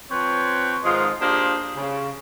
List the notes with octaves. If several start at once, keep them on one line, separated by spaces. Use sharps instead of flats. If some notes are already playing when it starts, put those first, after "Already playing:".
F3 C4 B4 C#5
G#2 D#3 F3 G#3 F4 G#4
A#3 D4 F4 G4 G#4 C5
C#3